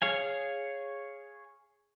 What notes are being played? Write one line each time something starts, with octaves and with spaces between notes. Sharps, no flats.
G#4 C#5 F5 G#5